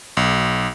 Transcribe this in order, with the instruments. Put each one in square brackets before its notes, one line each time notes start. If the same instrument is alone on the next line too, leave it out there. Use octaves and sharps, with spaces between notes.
[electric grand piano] B1